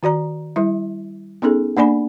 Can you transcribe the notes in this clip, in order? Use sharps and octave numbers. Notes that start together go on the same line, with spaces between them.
D#3 F#4 D5 A#5
G3 E4 E5
B3 C#4 D#4 G#4 A4
A#3 D4 D5 G#5 B5